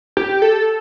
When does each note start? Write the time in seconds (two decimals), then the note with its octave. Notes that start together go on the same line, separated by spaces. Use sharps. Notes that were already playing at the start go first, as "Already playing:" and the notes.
0.17 G4
0.42 A4